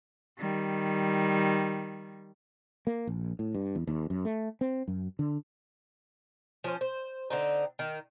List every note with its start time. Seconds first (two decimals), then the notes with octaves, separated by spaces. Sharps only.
0.38 D#3 G3
2.87 A#3
3.07 A#1
3.39 A2
3.54 G2
3.75 E2
3.87 D#2
4.10 F#2
4.25 A3
4.61 C4
4.88 F#2
5.19 D3
6.64 F3 C#4 C5
6.81 C5
7.30 D3 C4 D#4
7.79 D#3